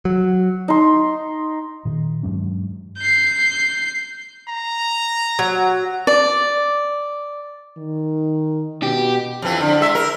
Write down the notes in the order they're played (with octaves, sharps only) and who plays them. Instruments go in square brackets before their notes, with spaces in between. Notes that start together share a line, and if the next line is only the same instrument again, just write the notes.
[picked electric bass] F#3
[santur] D#4 C6
[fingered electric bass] A#2 D#3
G2 F#3 G#3 C#4
[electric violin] G6 C7
[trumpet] A#5
[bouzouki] F#3
[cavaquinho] D5
[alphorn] D#3
[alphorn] B2 [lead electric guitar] G4
[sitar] F2 E3
D3
G#3 E5
A#4